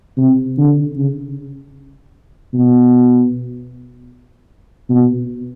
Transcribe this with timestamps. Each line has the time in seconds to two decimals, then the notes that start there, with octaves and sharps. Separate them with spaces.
0.17 C3
0.58 D3
0.97 C#3
2.54 B2
4.89 B2